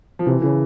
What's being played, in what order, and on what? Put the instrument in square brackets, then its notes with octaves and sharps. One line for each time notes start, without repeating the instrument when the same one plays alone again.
[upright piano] F3
[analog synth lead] C3 [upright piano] E3
[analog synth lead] C#3 [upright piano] E3